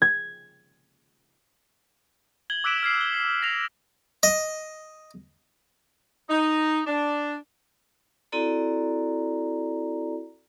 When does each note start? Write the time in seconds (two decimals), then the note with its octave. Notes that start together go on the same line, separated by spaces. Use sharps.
0.02 G#6
2.50 G#6 F#7 G7
2.64 D6 E6 F#6 B6 D7 E7
2.83 F6 G#6 C7
3.01 G#6 G7
3.14 C7
3.42 A#6 C7 F7
4.23 D#5
6.30 D#4
6.87 D4
8.32 C4 E4 F#4 A4 D5 A#5